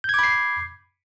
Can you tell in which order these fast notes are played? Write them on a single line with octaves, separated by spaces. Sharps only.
G6 G#6 D6 B5 C7